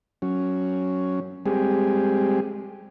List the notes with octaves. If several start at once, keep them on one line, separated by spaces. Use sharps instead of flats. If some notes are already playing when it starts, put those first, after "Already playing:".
F#3 C#4
G3 G#3 C4 G4 G#4